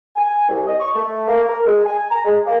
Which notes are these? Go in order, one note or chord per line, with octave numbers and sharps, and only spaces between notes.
G#5
C2
D#5
C#6
A3
A#3
A#4
G#3
G#5
A#5
G#3
A#3